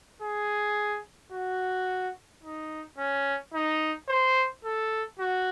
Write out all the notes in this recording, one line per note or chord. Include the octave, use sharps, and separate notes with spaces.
G#4
F#4
D#4
C#4
D#4
C5
A4
F#4